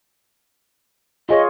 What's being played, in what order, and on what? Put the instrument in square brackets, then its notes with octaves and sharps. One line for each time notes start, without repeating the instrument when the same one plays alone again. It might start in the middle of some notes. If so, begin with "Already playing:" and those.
[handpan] F4 G#4 C#5 [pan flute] D#5